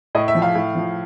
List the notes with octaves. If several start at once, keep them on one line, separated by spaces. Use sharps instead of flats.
A2 D#5
E5
F3
F5
A2
F3